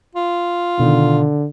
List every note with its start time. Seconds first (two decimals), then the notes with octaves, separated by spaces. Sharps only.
0.15 F4
0.79 B2 D3 D#3